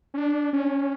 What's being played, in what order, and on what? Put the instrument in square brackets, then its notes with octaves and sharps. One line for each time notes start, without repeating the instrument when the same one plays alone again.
[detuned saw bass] C#4
D4
C#4